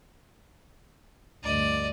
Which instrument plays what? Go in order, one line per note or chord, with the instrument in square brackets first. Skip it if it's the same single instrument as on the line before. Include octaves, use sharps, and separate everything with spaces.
[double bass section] D2 G2 [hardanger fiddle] D5 D#5